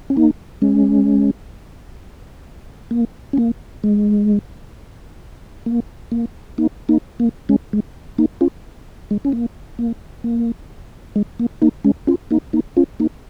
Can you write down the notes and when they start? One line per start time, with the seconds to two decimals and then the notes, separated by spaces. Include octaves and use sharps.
0.10 C#4
0.17 A#3 D#4
0.62 G#3 C#4
2.91 A#3
3.33 C#4
3.38 A#3
3.84 G#3
5.66 A#3
6.12 A#3
6.58 A#3 D#4
6.89 A#3 D#4
7.20 A#3
7.49 G#3 C#4
7.73 G#3
8.18 A#3 D#4
8.41 C#4 F4
9.11 G#3
9.25 C#4
9.32 A#3
9.79 A#3
10.24 A#3
11.16 G#3
11.39 A#3
11.62 A#3 D#4
11.84 G#3 C#4
12.07 C#4 F4
12.31 A#3 D#4
12.53 A#3 D#4
12.77 C#4 F4
13.00 A#3 D#4